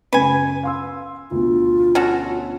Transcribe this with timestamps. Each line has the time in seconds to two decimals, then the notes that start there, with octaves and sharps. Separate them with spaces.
0.13 F#2 C#3 B4 G#5
0.63 F5 C6 E6
1.31 D2 B2 F4
1.95 C#4 F#4 A4